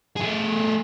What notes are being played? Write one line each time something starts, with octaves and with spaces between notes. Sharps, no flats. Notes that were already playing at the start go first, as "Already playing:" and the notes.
A3 G#4